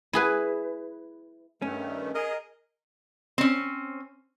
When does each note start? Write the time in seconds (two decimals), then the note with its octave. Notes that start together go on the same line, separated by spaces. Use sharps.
0.13 E4 G#4 B4
1.62 G2 D#3 A3 C#4
2.14 G#4 A#4 D#5
3.38 C4 C#4